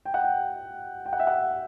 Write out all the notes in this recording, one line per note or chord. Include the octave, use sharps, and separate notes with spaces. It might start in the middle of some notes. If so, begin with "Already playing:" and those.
G5
F#5
G5
G5
F#5
E5
F#5